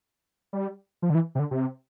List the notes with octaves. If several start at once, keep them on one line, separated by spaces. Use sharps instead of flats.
G3
F3
D3
E3
C3
D3
C3